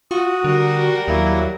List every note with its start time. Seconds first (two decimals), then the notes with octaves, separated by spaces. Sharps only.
0.11 F4 F#4 D#6
0.44 D3 G3 A#4
1.08 D#2 F#3 A#3 E4